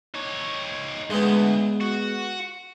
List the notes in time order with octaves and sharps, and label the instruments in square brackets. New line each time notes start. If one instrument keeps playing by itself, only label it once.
[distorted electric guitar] D#4 C#5
[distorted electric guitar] D2 [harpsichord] G#3 B3
[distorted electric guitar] F#4